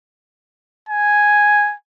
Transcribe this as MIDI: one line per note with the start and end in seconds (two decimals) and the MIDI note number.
0.89 1.75 80